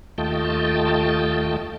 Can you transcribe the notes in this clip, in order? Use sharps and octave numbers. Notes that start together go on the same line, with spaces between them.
D#2 A3 F4 D#5 G5 A5